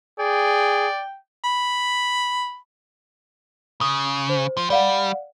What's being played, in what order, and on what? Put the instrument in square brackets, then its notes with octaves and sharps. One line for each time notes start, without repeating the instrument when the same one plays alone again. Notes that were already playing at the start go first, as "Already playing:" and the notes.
[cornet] G#4 [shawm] D5 [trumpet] G5
[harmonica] B5
[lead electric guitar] C#3 [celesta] D#6
[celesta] C5
[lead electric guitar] F3
[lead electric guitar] G3 [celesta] D5 F5 F#5